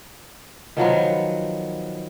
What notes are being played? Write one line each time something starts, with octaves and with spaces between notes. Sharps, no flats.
D#3 F3 F#3 B3